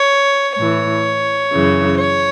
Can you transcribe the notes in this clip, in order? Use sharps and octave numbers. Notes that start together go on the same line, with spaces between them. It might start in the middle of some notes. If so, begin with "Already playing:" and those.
Already playing: C#5
A2 E3 C#5
F#2 C#3 E3
C#5